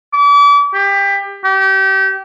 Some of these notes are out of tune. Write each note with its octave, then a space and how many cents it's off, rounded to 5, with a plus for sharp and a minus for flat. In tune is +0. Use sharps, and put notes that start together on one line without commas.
D6 -40
G4 +25
G4 -30